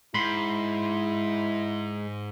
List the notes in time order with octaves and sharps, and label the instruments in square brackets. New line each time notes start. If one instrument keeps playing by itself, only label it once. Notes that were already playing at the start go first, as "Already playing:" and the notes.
[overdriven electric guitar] G#2 [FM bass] G#3 [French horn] E4 [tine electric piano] B5 C6